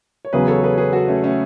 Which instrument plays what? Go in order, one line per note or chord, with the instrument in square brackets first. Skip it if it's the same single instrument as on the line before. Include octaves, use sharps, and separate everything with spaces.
[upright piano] C#5
[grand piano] E2 C#3 F#3 [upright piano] G#4 B4
[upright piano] A4 C#5
G#4 B4
G#4 B4
F#4 A4
A3 C#4
A3 C#4